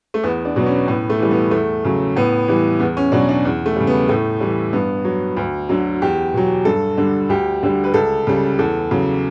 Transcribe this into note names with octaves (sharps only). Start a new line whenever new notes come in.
A3
E2 B3
D4
B2 F#3 B3
C#4
A2 B3
A3
E3 G3
B3
E2 A3
C#3 F#3
A2 B3
E3 G3
E2 B3
C#4
B2 F#3 D4
D4
E2
A3
C#3 G3
B3
A2 A3
E3 G3
G2 B3
F#3
D2
D3 F#3
E2 G4
B2 F#3
G2 A4
D3 G3
D2 G4
D3 G3
B4
C#2 A4
C#3 G3
E2 A4
C#3 F#3